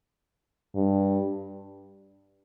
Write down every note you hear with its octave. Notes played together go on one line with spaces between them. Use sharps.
G2